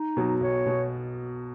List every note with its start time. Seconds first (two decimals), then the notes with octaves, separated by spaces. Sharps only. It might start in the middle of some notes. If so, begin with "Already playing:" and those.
Already playing: D#4
0.17 B2 F#3
0.41 B1 C#5
0.66 B2